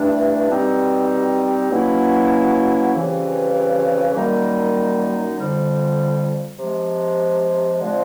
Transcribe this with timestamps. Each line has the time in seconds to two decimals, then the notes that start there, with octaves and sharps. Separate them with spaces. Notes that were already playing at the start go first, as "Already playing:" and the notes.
Already playing: G2 E3 A3 D4
0.48 B2 G3 C4 D#4
1.70 B2 F#3 A#3 C#4 E4
2.93 F2 C#3 E3 G3
4.14 F#2 D#3 G3 A#3 D#4
5.37 F2 D3 G3
6.59 C3 F3 G#3
7.80 D3 F3 G#3 C4